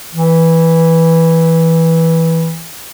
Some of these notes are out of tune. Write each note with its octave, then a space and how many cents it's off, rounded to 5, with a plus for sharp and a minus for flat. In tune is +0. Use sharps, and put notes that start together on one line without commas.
E3 -10